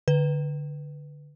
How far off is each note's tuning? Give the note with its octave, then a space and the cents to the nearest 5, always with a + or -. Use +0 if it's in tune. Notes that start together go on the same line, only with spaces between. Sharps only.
D3 +0 B4 +0